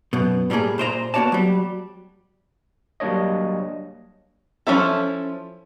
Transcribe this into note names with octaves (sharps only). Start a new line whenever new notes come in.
F#2 B2
A2 G3 A3 A#3 G#4
A#2 C5 D5 A#5
A#3 B3 F#4 C#5 D5 A5
F#3 G3
F#3 G3 A#3 D4 C#5 D#5
F3 C4 C#4 E4 A4